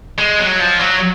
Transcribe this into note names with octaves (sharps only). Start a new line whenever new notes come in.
G#3
F#3
F3
F#3